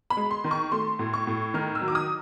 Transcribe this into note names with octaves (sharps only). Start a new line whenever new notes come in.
B5
G#3
C6
D#3
C#6
A3 C6
A2
C#6
A2
D#3 F6
E6
F#3
D6
D#6